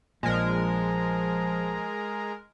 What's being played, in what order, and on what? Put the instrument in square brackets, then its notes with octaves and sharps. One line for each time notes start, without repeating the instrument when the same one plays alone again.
[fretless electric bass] A#1 A#2 [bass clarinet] F3 [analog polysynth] G#3 A#4